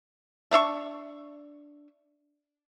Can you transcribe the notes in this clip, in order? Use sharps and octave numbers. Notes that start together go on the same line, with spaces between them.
A3 D4 E5 C#6